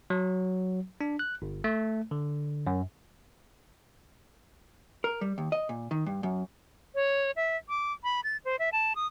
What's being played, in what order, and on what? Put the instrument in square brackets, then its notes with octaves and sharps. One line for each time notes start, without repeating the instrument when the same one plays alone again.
[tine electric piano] F#3
D4
F#6
G1
A3
D3
F#2
[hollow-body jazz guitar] A#4
G3
D#2
D#5
A#2
D#3
G2
F#2
[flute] C#5
E5
D6
B5
A6
C5
E5
A5
D#6